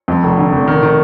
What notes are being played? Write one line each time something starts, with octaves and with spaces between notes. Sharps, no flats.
F2
F1
D3
F1
D#3
D#3